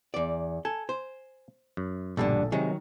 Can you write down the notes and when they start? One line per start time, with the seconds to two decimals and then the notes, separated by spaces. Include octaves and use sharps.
0.14 E2 D5
0.65 A4 G#5
0.89 C5
1.77 F#2
2.17 A#1 G2 B2 D3 A4
2.52 C3 D#3 F#3 G#3